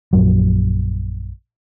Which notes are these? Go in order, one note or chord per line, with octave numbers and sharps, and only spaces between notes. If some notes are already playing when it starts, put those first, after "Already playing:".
A#1 F#2 F#3